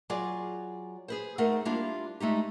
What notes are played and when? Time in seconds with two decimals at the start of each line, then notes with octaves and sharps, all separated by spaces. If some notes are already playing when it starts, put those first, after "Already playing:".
0.10 F#3 F4 G#4 D5
1.08 G#4 B4 C5
1.38 A3 D#4 G#4 A#4 C5 F#5
1.65 G3 A#3 D4 E4 F4
2.20 G#3 A3 D#4 G4